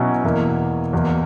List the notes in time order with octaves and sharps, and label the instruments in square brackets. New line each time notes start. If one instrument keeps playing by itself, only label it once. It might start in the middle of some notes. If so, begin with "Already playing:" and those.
Already playing: [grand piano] B2 F#3 C#4 E4
E2 B2 A#3 E4
E2 B2 A#3